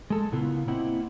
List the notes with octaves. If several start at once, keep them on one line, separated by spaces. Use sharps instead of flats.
G#3 A4
A#2 C#3 B3 E4 F4
A#3 C4 E4 D#5 F#5